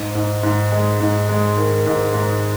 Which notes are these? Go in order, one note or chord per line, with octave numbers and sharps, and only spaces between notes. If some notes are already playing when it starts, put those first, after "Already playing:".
Already playing: G#2
G#2
G#2
G#3
G#2
G#3
D#3
G#2
G#2